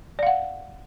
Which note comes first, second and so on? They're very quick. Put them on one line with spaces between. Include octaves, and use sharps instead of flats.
D5 F5 F#5